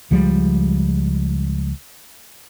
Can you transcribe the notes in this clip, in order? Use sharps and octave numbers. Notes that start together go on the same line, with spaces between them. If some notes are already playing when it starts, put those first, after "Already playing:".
C#2 F3 G3 G#3